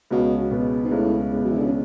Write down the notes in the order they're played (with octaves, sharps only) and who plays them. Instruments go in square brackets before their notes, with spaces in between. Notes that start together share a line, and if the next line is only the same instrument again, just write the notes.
[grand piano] C#2 [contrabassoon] B2
[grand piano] B2 G#3 B3
[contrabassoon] G#2
[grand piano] C#2 [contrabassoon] A2
[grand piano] B2 G#3 B3
[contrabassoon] F#3
E3
D3
C#3